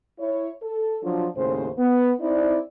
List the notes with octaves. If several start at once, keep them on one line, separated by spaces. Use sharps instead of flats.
E4 C#5
A4
F3 F#3 D4 F4
D#2 A2 C#3 C5
B3
C4 D#4 E4 C5 D5